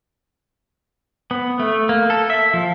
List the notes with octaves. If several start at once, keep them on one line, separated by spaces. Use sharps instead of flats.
B3
A3
A#3
A4
E5
F3